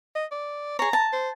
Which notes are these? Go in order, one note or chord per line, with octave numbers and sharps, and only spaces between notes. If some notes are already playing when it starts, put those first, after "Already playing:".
D#5
D5
G#4 C#5 A#5
A5
C5